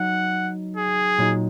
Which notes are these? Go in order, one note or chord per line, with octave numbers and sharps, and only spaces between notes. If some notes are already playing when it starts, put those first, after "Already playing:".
Already playing: F#3 D#4 F#5
G#4
A#2 F#3 D#4